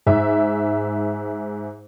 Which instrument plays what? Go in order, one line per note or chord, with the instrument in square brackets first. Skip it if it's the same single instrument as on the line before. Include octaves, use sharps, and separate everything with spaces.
[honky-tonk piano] G#2 E5